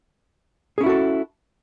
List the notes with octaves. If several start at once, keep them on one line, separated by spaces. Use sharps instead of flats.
C#4 E4 F#4 G#4 A4